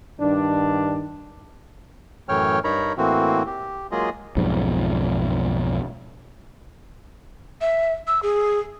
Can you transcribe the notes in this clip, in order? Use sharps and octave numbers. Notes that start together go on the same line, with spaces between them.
G2 D#3 D4
F#2 A2 E3 C#5 G5 F6
G2 D#4 A#4 C#5 A#5 B5
A2 E3 A#3 C4 F#4
G4
F#3 G#3 A#3 F4 G#4 D#5
B1 F2 G#2
E5
E6
G#4